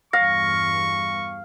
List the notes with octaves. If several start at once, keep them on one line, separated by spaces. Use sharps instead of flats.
E2 G2 F5 C#6 A#6